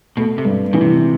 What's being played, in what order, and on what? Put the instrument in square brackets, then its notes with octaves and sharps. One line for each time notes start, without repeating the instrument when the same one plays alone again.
[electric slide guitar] B2 [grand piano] A3
[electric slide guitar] C3
[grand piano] G2
[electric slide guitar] B2 [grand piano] E3
[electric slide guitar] C3